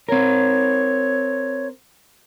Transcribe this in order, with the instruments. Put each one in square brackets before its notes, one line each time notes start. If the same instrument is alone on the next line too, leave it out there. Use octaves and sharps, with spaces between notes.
[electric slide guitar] C4 A#4 [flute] C#5